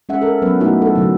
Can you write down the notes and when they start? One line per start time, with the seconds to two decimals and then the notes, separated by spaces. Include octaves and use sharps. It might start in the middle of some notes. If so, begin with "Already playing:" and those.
0.09 G#3 C#4 E5 F#5
0.22 A4 A#4
0.42 F#3 B3 C#4 B4
0.60 A3 B3 D#4 E4 F#4
0.82 E4 A4
0.95 D3 F#3